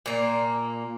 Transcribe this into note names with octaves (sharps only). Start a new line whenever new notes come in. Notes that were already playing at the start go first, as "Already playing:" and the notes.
A#2 A#3